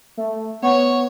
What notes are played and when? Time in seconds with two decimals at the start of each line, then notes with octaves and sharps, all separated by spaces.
0.17 A3
0.62 B3 C#5